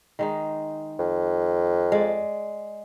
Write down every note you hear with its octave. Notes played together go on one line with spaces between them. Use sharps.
D#3 G#3 D#4
F2
G#3 D5